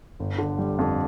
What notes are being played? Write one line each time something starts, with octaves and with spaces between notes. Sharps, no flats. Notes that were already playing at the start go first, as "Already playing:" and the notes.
G1
D3
G3
F2